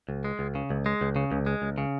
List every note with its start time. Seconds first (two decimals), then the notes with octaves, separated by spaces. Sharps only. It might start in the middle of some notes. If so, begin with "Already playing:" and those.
0.09 C#2
0.24 G#3
0.39 C#2
0.55 C#3
0.70 C#2
0.86 G#3
1.01 C#2
1.16 C#3
1.31 C#2
1.46 G#3
1.62 C#2
1.78 C#3